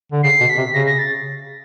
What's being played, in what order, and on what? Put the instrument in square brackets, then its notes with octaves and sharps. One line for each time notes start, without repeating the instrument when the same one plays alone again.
[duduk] D3
[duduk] C#3 [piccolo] C7
[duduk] B2
[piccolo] B6
[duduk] C3
[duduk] C#3 [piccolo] A#6
[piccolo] A#6
A6